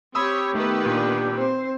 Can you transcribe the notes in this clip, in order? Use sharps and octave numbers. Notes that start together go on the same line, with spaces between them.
C4 G4 C#5 B5 D#6 E6
D#3 A3 B3 B4
A#2 D4
C4 C5